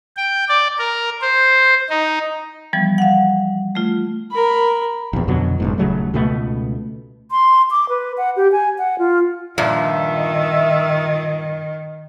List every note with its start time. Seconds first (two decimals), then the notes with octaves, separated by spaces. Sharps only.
0.17 G5
0.49 D5
0.78 A#4
1.22 C5
1.90 D#4
2.73 E3 F3 G3 B3
2.98 F5 F#5
3.75 A3 F4
4.31 A#4 B5
5.13 A#1 E2
5.28 F2 B2 D3 F#3
5.60 F#1 B1 G#2
5.78 D#1 C#3 F#3 A3
6.14 C#2 B2 A3 B3
7.31 C6
7.71 D6
7.89 B4
8.18 F#5
8.36 G4
8.52 G#5
8.78 F#5
8.99 F4
9.58 G2 A#2 D#3 F3 E5